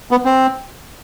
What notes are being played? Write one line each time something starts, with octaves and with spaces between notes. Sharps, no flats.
B3
C4